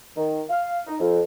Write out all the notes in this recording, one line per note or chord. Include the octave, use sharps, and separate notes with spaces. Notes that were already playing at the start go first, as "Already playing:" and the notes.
D#3
F5
D#4
F2